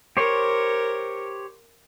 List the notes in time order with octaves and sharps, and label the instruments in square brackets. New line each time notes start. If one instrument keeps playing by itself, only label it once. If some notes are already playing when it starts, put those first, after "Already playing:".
[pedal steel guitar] G4 C5 C#5 [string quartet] A#4